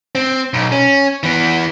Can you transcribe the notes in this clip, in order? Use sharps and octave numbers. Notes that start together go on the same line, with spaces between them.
C4
B1
C#4
E3 B3